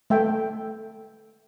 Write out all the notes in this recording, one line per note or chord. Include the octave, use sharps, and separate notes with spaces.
A3 E5 G5